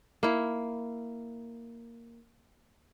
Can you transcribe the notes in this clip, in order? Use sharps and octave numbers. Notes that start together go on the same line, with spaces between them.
A#3 E4